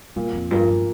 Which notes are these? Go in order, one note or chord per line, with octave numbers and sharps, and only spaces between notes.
A#2 G3
F2
G2 F3 A#3 F4
G2